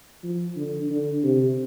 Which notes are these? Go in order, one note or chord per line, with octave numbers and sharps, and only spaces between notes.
F3
D3
D3
C3